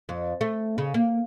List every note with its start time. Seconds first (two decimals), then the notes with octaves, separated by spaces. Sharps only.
0.09 F2
0.41 A3
0.78 C#3
0.94 A#3